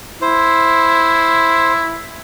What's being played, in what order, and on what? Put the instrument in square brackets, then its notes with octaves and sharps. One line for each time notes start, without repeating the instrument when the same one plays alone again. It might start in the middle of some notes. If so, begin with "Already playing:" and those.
[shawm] E4 [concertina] C5